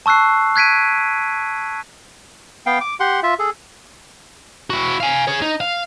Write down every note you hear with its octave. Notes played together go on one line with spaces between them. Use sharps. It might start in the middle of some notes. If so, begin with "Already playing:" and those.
A5 C#6 E6 F#6 C7
F#6 G#6 B6 D7 D#7
B3 F5 G5
D6
G4 F#5 C6
F4 E5
G#4 A4
E4 F#4
F5 G#5
G#4 C#5
D#4
F5